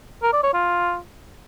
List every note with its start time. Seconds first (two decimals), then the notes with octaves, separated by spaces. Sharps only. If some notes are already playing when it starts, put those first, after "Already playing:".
0.23 A#4
0.33 D5
0.43 C#5
0.54 F4